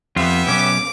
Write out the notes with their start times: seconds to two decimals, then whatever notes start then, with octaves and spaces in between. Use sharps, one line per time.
0.16 F2 B3 F4 G4 E5
0.47 B1 C#4 D6